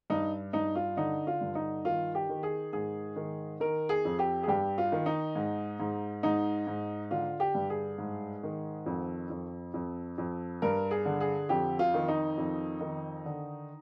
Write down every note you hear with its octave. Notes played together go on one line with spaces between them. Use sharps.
G2 D#4
G2 D#4
F4
D3 D#4
F4
G2
D#4
D#3 F4
G4
D#3
G#4
G#2 G#4
D#3
D#3 A#4
G#4
F2
G4
G#4
G2 G4
F4
D#3
D#4
G#2
G#2
G#2 D#4
G#2
D3 F4
G4
G2
G#4
G#2
D#3
F2
F2
F2
F2
G2 A#4
G#4
D3
G#4
F2 G4
F4
D#3
D#4
F2
D#3
D3